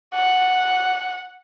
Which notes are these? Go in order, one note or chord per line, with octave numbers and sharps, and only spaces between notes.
F#5